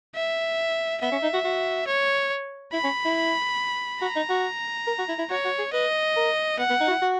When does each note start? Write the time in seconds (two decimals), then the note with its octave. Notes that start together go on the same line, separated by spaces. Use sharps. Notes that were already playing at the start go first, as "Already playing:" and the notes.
0.15 E5
1.01 B3 E5
1.12 C#4
1.23 D#4
1.34 F#4
1.45 F#4
1.87 C#5
2.73 E4 B5
2.84 C#4
3.05 E4
4.02 F#4 A#5
4.16 D#4
4.30 F#4
4.87 A#4
4.99 F#4
5.09 E4
5.19 E4
5.30 F#4 C#5
5.45 F#4
5.58 G#4
5.73 B4 D#5
6.16 A#4
6.58 B3 F#5
6.70 B3
6.81 D#4
6.87 F#4
6.91 E4
7.02 F#4